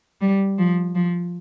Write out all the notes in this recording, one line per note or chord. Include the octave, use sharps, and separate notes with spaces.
G3
F3
F3